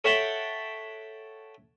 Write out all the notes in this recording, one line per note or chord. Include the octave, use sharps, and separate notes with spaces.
A4 C#5 E5 F#5 G5 A5